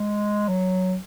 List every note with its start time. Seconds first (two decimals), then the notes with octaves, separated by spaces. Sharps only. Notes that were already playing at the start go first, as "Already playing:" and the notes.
Already playing: G#3
0.48 F#3